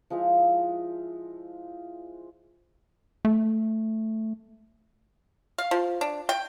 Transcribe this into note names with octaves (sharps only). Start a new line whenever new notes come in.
F3 G#3 E4 C#6
A3
F5
F3
D4
G5